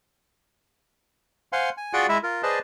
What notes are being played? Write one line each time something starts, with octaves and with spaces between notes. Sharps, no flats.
C5 F5 F#5 G#5 C6
G#5
F4 F#4 G#4 D5 F#5 G5
G#3 E4 E5
F4 A#4
G#4 B4 C5 D5 D#5 A5